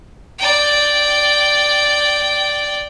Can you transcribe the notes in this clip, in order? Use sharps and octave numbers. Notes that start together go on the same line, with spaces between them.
D5 G5